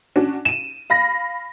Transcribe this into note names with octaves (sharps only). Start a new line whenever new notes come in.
C#4 D4 F#4
D#7 E7
F5 B5 A#6